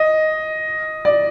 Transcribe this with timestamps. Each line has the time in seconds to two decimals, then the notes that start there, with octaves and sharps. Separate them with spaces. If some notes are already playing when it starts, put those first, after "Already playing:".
Already playing: D#5
1.05 D5